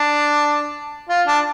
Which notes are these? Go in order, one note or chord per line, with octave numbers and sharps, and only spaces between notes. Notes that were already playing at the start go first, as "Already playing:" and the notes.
Already playing: D4
F4
D4